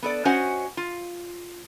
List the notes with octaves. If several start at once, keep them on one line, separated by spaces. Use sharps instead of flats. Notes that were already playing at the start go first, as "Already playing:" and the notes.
B3 A4 D5
C#4 F#4 C5 D#5 F#5 G#5
F4